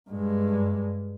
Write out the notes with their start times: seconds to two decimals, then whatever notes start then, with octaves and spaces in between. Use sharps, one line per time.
0.10 G2 G#3